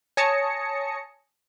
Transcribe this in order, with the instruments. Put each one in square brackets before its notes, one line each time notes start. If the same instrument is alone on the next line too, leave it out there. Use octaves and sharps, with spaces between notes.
[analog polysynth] C#5 G#5 A5 D#6 A#6 C#7